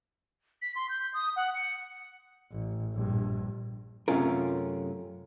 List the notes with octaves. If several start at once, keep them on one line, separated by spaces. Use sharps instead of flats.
B6
C6
G6
D#6
F#5
C#7
A1
A#1 G2
F#2 C3 A3 C#4 F4 A#4